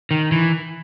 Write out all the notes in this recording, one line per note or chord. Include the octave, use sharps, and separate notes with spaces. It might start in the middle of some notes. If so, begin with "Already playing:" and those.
D#3
E3